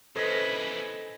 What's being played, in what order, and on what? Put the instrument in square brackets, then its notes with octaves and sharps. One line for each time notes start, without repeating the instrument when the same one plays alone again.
[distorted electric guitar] C#3 E4 [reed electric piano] A4 [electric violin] B4 [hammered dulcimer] C5 D#5 G#5